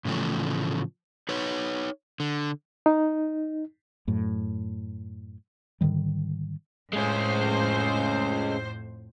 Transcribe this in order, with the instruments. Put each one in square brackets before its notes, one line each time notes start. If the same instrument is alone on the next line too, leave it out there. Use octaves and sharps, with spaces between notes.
[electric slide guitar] A2 C#3 E3 F3 A3
D#4 B4 C#5
D3
[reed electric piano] D#4
[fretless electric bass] F#2 A2
G#2 D3 D#3 G3
[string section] F2 A2 C5 [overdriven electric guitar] G#3 C#4